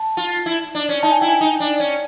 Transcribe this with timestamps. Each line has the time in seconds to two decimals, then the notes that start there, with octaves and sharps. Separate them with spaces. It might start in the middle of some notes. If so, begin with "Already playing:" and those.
Already playing: A5
0.17 F4
0.46 E4
0.75 D4
0.89 C#4
1.03 D#4 A5
1.12 G#5
1.21 E4 G5
1.29 G#5
1.41 D#4
1.60 D4
1.80 C#4